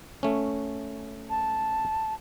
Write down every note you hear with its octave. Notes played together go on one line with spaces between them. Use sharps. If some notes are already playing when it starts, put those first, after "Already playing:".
A3 C#4
A5